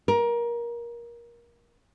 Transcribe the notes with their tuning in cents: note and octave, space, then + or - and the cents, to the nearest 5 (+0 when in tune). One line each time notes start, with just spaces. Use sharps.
A#4 +20